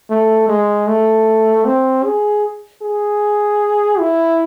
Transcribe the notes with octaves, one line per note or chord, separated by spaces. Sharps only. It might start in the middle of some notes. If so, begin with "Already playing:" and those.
A3
G#3
A3
C4
G#4
G#4
E4